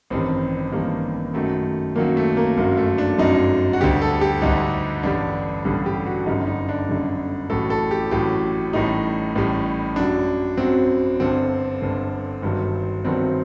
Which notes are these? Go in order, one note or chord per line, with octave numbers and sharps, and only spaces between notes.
A1 G2 D#3 G3 C4
A1 G2 D#3 G3 A#3
F#2 D#3 F#3 A3
F#2 D#3 F#3 A#3
A3
A#3
G1 F#2 F#3 A#3
A3
D4
G1 F#2 F#3 D#4
F#4
D2 D3 G3 G4
A4
G4
D2 D3 G3 D#4
A1 G2 D3 G3 D4
A1 G2 D3 G3
G4
F#4
G1 F#2 D3 G3 D#4
D#4
D4
G1 F#2 D3 G3
A1 A2 F#3 A4
A4
G4
A1 A2 F#3 G4
A1 A2 G3 D#4
A1 A2 G3
F#2 F#3 D4
F#2 F#3 C4
G1 G2 D3 C4
G1 G2 D3
G1 G2 D#3 F#3
G1 G2 D#3 F#3 C4